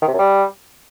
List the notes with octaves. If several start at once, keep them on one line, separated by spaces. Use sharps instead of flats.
D#3
C3
F#2
G3